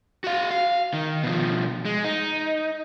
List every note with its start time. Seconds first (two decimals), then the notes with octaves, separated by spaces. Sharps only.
0.24 F#4 F5
0.51 F5
0.94 D#3
1.23 B2 F3
1.85 G#3
2.04 D#4